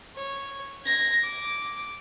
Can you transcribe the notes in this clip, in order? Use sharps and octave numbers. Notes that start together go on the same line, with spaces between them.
C#5
G#6 A#6
D6